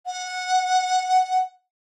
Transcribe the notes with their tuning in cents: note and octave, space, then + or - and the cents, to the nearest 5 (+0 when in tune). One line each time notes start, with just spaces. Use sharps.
F#5 -10